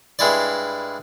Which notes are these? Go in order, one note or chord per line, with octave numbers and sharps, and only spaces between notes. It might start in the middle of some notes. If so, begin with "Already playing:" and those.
G2 G#3 E4 D5